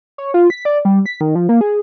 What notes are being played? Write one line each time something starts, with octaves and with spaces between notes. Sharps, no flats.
C#5
F4
B6
D5
G3
B6
D#3
F3
A#3
G#4